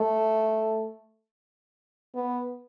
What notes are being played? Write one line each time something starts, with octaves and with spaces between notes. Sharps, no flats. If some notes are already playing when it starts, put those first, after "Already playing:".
Already playing: A3
B3